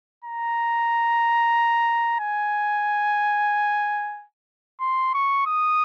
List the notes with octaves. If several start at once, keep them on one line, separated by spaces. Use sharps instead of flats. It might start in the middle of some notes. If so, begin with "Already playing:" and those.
A#5
G#5
C6
C#6
D#6